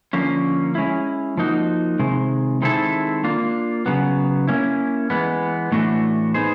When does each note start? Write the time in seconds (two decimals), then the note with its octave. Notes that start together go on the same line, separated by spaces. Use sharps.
0.13 D3 F3 A#3 C#4
0.75 G#3 C#4 E4
1.38 F3 A#3 D#4 F#4
1.99 C3 D#3 G#3
2.62 D#3 G#3 C4 E4 A4
3.24 A#3 D4 F4
3.86 C#3 F#3 B3
4.47 A#3 C#4 E4
5.10 E3 G#3 B3
5.72 A2 E3 A3 D4 F#4
6.34 B3 D#4 G#4 C5